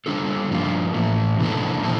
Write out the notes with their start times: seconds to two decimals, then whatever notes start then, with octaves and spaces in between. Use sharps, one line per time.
0.06 G3 D4 F4 A4
0.50 G2 F3 A#3 F4
0.94 A2 E3 A3
1.39 C3 E3 A#3 D4 A4
1.83 A#2 F3 C4 E4 A4